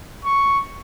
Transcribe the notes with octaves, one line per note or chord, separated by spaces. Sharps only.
C#6